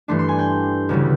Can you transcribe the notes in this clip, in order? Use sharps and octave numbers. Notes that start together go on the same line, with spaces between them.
G2 E3 A3 D4 C6
C6
G#5
G5
D2 C#3 E3 G3